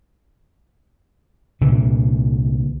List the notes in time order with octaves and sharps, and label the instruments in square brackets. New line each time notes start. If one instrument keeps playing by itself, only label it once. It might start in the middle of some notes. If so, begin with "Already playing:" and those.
[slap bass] C2 A#2 D3 E3